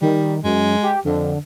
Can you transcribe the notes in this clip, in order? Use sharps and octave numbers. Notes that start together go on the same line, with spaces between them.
D#3 G3
F#2 G#3
G4
F2 D3